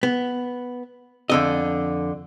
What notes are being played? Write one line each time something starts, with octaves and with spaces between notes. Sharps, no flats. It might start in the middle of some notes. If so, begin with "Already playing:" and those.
B3
F2 D3 D#5